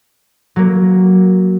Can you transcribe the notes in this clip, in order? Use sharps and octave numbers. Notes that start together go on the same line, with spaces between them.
F#3 A#3